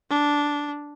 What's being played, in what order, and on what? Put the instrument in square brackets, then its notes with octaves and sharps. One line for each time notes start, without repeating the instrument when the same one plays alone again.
[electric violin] D4